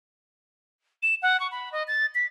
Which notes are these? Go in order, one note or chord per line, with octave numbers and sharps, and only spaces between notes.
E7
F#5
C#6
B5
D#5
A6
B6